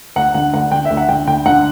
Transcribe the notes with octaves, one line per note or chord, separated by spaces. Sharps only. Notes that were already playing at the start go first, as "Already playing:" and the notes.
D2 F#5
D3 F#5
D2 F#5
D3 G5
E5
D2
F#5
D3 G5
D2 G5
D3 F#5